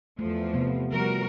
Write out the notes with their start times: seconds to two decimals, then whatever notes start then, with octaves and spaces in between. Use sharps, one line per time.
0.19 E2 F3 A3
0.54 C3 B3
0.93 F3 G3 F#4 A#4